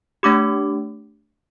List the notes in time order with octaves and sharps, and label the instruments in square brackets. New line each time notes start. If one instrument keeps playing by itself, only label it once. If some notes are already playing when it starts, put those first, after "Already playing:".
[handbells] A3 D4 G4 D6